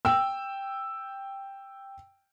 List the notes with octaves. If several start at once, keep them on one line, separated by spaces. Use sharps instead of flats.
G5 E6